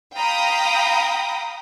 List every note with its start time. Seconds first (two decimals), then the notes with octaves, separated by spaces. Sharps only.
0.17 F5 G5 A#5 B5 D#6